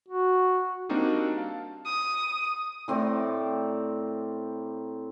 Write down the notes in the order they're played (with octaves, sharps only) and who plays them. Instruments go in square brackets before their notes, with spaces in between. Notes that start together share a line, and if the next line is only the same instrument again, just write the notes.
[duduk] F#4
[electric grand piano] G3 A#3 C4 D4 D#4 F#4
F5 A5
[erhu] D#6
[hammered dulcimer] A2 C4 A#4 D5